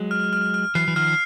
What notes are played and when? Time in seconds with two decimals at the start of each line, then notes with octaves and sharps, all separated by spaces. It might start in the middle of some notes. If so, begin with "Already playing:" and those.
Already playing: F#3 G#3
0.11 F6
0.33 F6
0.54 F6
0.75 E3 F#3 C7
0.88 E3
0.96 D#3 F3 F6